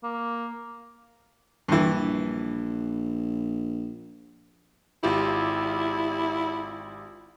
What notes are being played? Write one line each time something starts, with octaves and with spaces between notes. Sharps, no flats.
A#3
A#1 G2 E3
G#1 E4 F4 G4